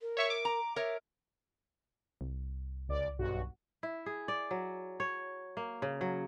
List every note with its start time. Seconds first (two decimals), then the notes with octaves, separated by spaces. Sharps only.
0.01 A#4
0.17 C#5 E5 C#6
0.30 D6
0.45 A#5
0.76 A#4 C#5 E5
2.21 C2
2.88 C#2 D5
3.19 B1 G2 F#4
3.83 E4
4.06 G#4
4.28 D5
4.51 F#3
5.00 C#5
5.57 A#3
5.82 C#3
6.01 F#3